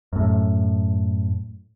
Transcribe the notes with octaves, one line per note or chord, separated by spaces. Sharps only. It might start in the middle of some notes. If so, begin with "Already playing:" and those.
F#2 A2